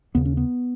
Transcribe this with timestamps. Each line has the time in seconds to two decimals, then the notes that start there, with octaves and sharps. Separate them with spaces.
0.15 D#2 C#3 B3
0.25 C#4
0.37 B3